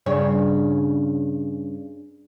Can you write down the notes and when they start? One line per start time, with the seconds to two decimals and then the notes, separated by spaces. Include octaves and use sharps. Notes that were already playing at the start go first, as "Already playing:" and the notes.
0.06 G2 C#3 C#5